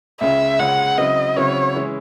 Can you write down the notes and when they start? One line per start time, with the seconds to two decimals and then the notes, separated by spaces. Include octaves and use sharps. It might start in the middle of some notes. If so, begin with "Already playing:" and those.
0.21 C#2 C#3 G#3 C#4 E5
0.59 C#2 C#3 G#3 C#4 F#5
0.98 C#3 F#3 C4 E4 D#5
1.36 C#3 F#3 C4 E4 C#5
1.74 E3 G#3 C#4 E4